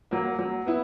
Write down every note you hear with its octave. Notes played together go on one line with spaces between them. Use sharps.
F#3 A#3
F#3
B3 E4